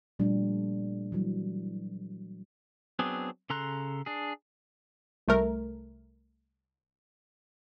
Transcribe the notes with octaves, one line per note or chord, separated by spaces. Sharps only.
A#2 F3 G3 A3 D4
E3 F#3 G3
F#3 B3 C4 D4 G#4
C#3 A4 A#5 C6 F#6
D4 G#4
C2 A3 A#4